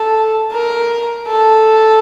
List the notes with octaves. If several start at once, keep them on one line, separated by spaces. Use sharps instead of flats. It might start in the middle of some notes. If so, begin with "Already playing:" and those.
Already playing: A4
A#4
A4